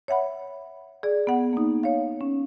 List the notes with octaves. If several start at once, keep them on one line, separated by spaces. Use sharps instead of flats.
C#5 E5 F#5 B5
G#4 D5
B3 F#5
A#3 D#4
C#5 F5
C#4